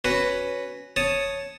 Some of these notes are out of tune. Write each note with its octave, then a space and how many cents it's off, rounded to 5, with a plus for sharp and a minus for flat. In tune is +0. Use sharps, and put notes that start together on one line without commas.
C#4 +0 F#4 +0 B4 +0
C#5 +0 A5 +0 D#6 +0